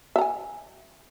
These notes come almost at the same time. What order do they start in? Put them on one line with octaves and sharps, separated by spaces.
E5 A#5 G#5